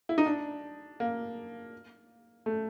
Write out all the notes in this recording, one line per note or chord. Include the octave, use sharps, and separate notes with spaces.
E4
D#4
D4
A#3
A3